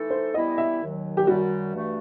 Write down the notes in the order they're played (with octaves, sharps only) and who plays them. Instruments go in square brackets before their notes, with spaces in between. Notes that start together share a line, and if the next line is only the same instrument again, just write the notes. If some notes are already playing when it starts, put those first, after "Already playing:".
Already playing: [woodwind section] E3 A3 D#4 A4
[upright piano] C5
[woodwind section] E3 G3 B3 E4 [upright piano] D#5
[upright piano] E5
[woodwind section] D#2 D#3 F#3
[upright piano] G4
[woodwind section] F#2 D#3 G3 [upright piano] F#4
[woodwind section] G2 E3 A3